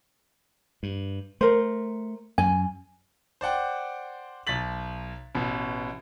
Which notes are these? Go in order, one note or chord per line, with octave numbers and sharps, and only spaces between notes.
G2
A3 A#4 C5
F#2 G#5
C5 D5 F#5 G5
B1 A6 B6 F#7
A1 B2